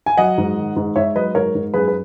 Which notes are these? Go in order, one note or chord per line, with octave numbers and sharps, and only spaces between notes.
G#5
F#3 D#5 F#5
G#2
D#3
G#2
G#2 C#5 E5
F#3 B4 D#5
G#2 A#4 C#5
G#2
F#2 G#4 B4
B4